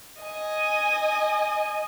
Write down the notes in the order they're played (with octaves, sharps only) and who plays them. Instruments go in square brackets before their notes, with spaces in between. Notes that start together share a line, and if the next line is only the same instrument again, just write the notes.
[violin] D#5 G#5